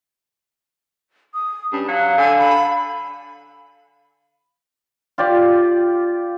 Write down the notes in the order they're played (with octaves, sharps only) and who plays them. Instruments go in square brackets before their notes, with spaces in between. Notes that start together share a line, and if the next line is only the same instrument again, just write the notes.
[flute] D#6
[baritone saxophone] G2 [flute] C#4
[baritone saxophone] F#3 [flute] F5
[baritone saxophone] D3 [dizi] G#5
[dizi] B5
[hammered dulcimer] F4 G4 D5